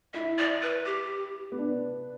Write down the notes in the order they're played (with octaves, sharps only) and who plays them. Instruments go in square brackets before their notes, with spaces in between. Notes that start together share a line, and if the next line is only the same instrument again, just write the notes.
[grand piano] E4 [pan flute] E5
[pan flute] D5
B4
G4
[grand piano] B3
D4